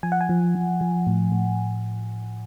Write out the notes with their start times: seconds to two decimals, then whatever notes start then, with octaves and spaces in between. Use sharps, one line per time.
0.03 F3 G#5
0.12 F#5
0.21 G#5
0.29 F3
0.55 F3
0.81 F3
1.07 A2
1.32 A2